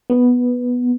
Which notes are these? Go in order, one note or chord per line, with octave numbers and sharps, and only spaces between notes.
B3